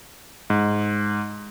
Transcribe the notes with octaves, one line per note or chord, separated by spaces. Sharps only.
G#2